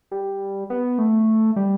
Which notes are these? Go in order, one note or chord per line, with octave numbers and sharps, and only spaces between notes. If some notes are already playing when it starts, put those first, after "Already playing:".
G3
B3
A3
G3